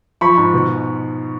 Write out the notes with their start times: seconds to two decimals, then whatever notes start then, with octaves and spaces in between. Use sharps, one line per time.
0.21 F3 B5 C#6
0.38 G#2
0.54 B2